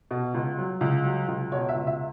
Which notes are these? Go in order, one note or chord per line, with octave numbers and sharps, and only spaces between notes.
B2
C#2
F#3
C#2
F#3
C#2
B2 C#5
E5
C#2
E5